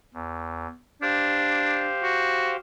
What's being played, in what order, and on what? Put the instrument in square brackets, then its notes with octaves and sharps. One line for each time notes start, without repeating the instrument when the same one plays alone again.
[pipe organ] E2
[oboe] D4 [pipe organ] G4 C5 F5
[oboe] F#4